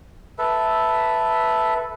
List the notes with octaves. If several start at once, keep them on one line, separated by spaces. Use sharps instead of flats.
A4 B4 E5